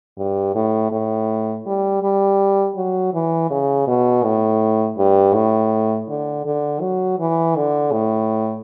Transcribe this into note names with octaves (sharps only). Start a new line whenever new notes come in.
G2
A2
A2
G3
G3
F#3
E3
C#3
B2
A2
G2
A2
D3
D3
F#3
E3
D3
A2